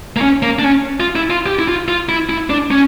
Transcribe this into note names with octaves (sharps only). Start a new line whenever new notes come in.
A#3
C#4
A#3
D4
C#4
F4
E4
F4
G4
E4
F4
F4
E4
E4
D4
C#4